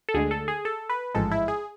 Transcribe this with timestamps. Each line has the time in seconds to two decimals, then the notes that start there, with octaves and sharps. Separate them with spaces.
0.09 A4
0.14 D2 D3 G#3 G#4
0.31 A4
0.48 G#4
0.65 A4
0.90 B4
1.15 A1 G#2 F3 G#3 A4
1.31 E4
1.48 G#4